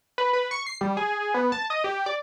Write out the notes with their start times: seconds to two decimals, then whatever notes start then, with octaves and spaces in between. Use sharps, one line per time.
0.18 B4
0.33 B4
0.51 C#6
0.66 C7
0.81 G3
0.97 G#4
1.34 B3
1.52 A5
1.70 D#5
1.84 G4
2.06 D5